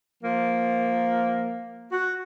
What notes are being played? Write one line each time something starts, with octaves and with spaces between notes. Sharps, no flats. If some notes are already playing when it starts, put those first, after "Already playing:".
F3 A#3
F#4